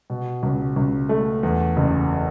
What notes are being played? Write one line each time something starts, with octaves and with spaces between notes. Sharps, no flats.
B2
C#2
C#2
A3
E2
F#1